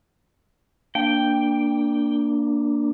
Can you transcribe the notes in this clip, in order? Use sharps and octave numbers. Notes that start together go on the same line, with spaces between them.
A#3 D4 G5